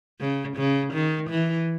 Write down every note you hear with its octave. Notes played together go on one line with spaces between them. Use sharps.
C#3
C#3
D#3
E3